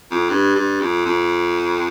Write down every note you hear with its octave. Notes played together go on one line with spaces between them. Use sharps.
F2
G2
G2
F2
F2